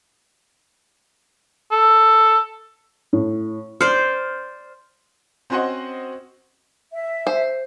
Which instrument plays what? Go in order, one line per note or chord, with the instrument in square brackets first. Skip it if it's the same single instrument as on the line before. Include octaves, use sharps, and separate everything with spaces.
[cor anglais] A4
[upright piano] A2
[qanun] C5 D5 [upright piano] F6
[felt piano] C4 C#4 F#4 C5 D#5 F#5
[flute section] E5
[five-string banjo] C5